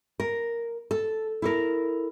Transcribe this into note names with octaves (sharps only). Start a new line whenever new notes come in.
A#4
A4
E4 A4 A#4